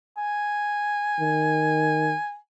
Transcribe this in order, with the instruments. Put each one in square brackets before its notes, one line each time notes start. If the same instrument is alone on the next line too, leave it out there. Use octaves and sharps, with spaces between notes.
[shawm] G#5
[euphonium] D#3